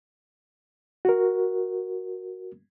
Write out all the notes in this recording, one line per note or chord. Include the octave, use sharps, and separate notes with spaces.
F#4 A#4